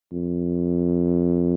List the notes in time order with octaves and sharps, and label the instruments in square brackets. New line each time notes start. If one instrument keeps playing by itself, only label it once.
[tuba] F2